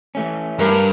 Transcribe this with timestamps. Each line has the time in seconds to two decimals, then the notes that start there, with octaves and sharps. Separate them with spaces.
0.15 E3 A3 C#4
0.59 G2 A#4